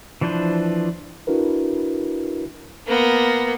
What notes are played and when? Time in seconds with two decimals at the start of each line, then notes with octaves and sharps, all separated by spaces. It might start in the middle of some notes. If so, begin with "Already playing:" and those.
0.21 E3 F3 D4 B4 C5
1.27 D4 E4 F#4 A#4 B4
2.87 A#3 B3